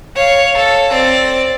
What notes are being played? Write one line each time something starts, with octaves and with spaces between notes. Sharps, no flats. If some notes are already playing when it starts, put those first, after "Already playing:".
C#5 F5
A4
C4 D5